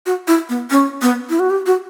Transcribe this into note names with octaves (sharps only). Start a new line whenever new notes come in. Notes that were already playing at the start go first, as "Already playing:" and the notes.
F#4
E4
B3
C#4
B3
E4
F#4
G4
F#4